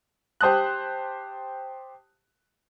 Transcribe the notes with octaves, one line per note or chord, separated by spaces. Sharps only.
G4 C5 A5 D#6 F#6